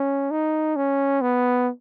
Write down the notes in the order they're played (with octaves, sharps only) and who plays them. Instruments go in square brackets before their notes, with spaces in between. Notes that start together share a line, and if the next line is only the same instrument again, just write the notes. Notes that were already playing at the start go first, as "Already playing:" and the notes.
Already playing: [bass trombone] C#4
D#4
C#4
B3